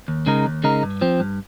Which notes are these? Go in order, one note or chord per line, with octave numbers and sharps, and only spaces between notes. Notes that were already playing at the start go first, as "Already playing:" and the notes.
D#2
C#3 G#3 D#4 A#4
D#2
C#3 G#3 D#4 A#4
G2
F3 C4
G2